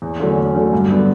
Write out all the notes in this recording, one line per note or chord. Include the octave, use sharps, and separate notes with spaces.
E2
D3 F#3 A3 C#4
E2
D3 F#3 A3 C#4
G2
D3 F#3 B3 D4